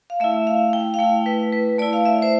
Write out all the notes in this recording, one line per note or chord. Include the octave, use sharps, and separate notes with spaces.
F5
A3 E4 E5
F5
G5
F5
A3 E4 G5
B4
B4
A3 E4 D5
F5
E5
C5